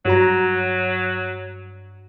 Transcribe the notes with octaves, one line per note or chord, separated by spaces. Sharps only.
G2 F#3 F#4 A#5